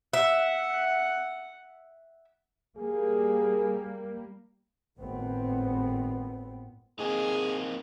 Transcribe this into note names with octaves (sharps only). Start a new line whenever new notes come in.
E5 F#5
G3 A#3 G#4
G#1 A2 B3 C4
A#3 C4 D#4 G#4